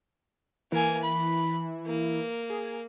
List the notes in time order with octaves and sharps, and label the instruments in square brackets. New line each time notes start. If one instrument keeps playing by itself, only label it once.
[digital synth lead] E3 [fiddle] A#3 G#5
[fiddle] B5
A#3
[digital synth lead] G#4